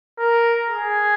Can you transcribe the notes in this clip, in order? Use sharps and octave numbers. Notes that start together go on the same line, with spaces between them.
A#4
G#4